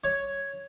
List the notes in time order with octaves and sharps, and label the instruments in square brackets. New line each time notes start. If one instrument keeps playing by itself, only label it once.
[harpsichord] C#5